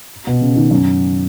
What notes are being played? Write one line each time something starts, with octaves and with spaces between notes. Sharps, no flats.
B2
C#3
D#3
F#2